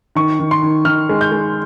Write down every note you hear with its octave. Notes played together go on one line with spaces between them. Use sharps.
D#3 C#6
D#3
C6
D#3
D#3 F6
G#3
G6
G#3